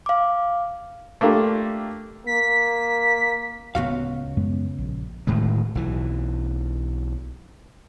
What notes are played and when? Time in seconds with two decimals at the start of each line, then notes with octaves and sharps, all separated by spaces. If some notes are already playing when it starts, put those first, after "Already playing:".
0.06 F5 D6
1.21 A3 A#3 D4 F4 G4
2.27 A#3 B6
3.75 D1 C#2 B3 F#4 F5
4.37 F#2 G#3 B3
4.78 A#1
5.27 D1 A2 D#3 G#3
5.75 B1 E3